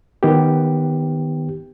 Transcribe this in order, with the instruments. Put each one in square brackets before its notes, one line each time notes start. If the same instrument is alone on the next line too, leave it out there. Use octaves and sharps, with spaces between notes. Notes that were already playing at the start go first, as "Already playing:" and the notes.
[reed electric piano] D#3 B3 G4